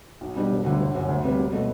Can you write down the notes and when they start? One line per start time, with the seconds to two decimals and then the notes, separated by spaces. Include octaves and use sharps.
0.21 B1
0.36 B2 G3 D4 G4
0.51 E1
0.64 D2 D3 G3
0.80 G1
0.94 F#2 D3
1.08 D2
1.23 C3 G3 B3
1.38 E1
1.53 B2 A3